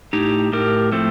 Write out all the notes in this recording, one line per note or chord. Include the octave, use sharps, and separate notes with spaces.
A2 D#4 G4
A2 G4 A#4
F3 A3 C4